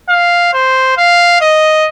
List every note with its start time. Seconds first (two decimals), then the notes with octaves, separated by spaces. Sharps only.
0.09 F5
0.54 C5
0.98 F5
1.41 D#5